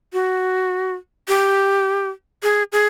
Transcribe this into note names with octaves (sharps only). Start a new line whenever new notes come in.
F#4
G4
G#4
G#4